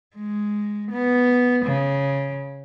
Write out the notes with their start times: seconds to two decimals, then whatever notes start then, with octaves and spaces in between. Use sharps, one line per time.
0.16 G#3
0.91 B3
1.65 C#3